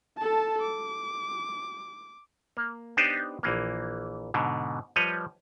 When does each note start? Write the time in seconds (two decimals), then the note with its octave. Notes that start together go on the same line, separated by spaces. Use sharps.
0.18 A4 A5
0.62 D6
2.57 A#3
2.97 B3 D4 D#4 G4 B4 C5
3.43 A#1 E3 A#3
4.34 G#2 B2 D3
4.96 F3 G3 B4 C#5 D#5